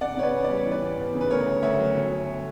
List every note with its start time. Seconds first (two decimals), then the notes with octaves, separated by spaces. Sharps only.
0.01 C#3 D5 F#5
0.17 C#3 C#5
0.23 B4 D5
0.33 E2
0.44 D5
0.50 G3
0.58 C#5
0.65 E3
0.71 B4 D5
0.82 E2
0.98 E2
1.14 C#3
1.21 B4
1.30 D2 A#4 C#5
1.46 D2
1.62 D2 C#5 E5
1.79 F#3
1.95 G1
2.11 G1